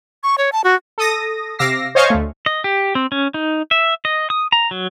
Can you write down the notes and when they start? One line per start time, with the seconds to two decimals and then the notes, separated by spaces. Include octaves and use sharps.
0.23 C#6
0.38 C#5
0.52 A5
0.64 F#4
0.98 A4 D#6 A#6
1.59 C3 F5 D6 E6 A#6 C7
1.95 C5 C#5 D#5 F5 G#5 C#6
2.10 D2 A3
2.46 D#5
2.64 G4
2.95 C4
3.12 C#4
3.34 D#4
3.71 E5
4.05 D#5
4.30 D#6
4.52 A#5
4.71 F#3